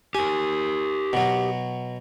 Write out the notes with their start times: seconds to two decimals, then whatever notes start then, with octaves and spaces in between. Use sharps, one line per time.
0.15 G4 A#4 G#5
1.13 B2 F#3